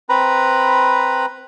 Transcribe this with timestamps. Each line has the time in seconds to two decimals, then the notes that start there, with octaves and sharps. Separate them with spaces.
0.09 C4 B4 A#5 B5